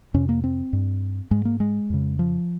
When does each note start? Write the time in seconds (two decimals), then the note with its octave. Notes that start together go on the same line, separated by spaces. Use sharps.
0.14 F2 C3 C#4
0.29 A#3
0.44 C4
0.73 G2
1.31 G#2 G#3
1.45 A#3
1.60 G#3
1.90 F2 C#3
2.19 F3